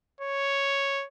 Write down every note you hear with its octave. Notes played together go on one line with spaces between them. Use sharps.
C#5